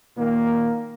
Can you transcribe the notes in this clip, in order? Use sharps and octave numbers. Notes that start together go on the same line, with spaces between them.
A#2 D#3 A#3